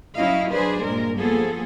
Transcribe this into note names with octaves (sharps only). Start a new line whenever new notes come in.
F#3 C#4 E4 D#5 F5
F#3 D4 G#4 B4 C5 D5
G2 A#2 G#3 A#4
F3 A#3 B3 G#4 A4